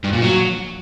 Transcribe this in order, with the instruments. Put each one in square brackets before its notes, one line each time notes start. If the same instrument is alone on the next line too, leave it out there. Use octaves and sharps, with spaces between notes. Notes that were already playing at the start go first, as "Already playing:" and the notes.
[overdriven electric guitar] G2
A#2
F#3